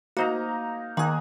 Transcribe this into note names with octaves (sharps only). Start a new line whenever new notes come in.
A#3 D#4 F#4 C5 A#5
D#3 A#3 G#4 F#6